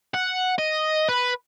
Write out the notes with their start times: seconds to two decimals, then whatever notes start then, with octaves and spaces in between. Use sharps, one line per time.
0.14 F#5
0.58 D#5
1.09 B4